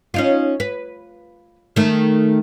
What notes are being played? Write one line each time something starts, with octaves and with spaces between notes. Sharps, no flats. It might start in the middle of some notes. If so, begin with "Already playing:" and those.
C#4 D#4 F4
B4
D#3 A3